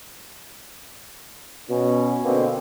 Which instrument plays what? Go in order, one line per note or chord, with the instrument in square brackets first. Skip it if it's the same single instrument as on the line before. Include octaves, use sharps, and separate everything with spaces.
[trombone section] B2 C#4
B2 D3 A#3 C4